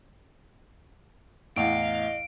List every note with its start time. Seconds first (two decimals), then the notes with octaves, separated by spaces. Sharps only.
1.56 E2 A2 D#5 F5 D7